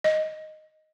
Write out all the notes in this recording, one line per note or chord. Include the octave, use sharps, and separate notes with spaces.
D#5